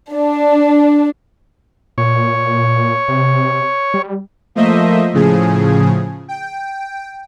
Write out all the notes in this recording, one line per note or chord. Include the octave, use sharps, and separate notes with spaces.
D4
A#2 C#5
C3
G3
F3 A3 A#3 C5 D#5 E5
A2 C#3 F3 G#4
G5